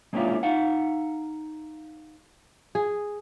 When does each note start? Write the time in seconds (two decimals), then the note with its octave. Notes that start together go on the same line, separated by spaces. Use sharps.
0.13 G#3 A#3 C#4 D4 E4 F4
0.43 D#4 F5 F#5
2.75 G#4